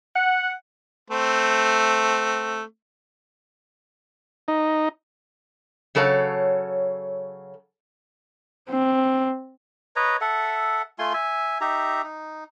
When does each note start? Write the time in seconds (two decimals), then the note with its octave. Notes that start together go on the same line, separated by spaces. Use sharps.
0.14 F#5
1.10 A3 C4
4.48 D#4
5.95 C#3 F#3 A4 C#5 F5
8.69 C4
9.96 B4 C#5 D#5 A#5
10.21 A4 E5 F#5
10.99 A3 F4 G#5 C6
11.14 E5 G#5
11.61 D#4 G4 E5 A#5
12.04 D#4